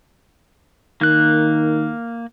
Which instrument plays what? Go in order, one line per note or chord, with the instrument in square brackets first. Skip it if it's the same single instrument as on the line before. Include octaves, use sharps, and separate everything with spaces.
[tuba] D#3 [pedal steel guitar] A#3 F#6